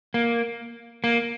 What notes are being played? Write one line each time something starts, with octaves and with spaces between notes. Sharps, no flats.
A#3
A#3